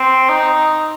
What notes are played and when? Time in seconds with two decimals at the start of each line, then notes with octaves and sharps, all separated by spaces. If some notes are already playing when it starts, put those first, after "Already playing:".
Already playing: C4
0.29 D#4